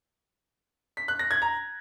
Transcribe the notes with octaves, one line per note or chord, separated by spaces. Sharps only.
B6
F#6
A#6
G#6
A#5